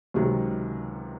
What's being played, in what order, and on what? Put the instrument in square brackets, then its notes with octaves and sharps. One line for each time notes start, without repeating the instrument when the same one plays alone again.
[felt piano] C#2 C3 D#3 F#3